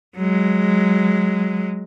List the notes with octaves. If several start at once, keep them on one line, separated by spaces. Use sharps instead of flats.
F#3 G#3